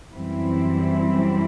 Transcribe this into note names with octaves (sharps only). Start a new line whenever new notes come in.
F#2 E3 G3 C4 E4